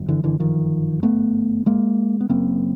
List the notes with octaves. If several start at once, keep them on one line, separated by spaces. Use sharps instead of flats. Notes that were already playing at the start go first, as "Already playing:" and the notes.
Already playing: G1 F#2
D3 E3
D3 E3
D#3 F3
A3 B3
G#3 A#3
B3
F#1 F#2 C#3 A#3 C4